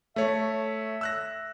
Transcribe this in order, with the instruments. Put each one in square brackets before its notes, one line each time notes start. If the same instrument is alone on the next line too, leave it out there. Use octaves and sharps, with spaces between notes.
[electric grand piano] A3 C#5 [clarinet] E5
[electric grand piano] E6 F#6 A#6